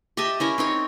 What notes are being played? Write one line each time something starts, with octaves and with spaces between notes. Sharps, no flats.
G4 D#5 E5 A5
C#4 E4 A#4
C4 D#4 C#5